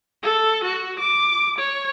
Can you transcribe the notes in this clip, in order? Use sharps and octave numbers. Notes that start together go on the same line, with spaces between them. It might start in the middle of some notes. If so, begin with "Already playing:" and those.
A4
F#4
D6
C#5